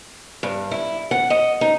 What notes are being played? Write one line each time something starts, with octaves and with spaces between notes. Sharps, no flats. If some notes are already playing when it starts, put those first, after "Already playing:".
G2
E4
F#5
D#5
D#4